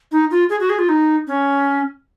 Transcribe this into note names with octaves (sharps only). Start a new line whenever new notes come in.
D#4
F4
G#4
F#4
G#4
F4
D#4
C#4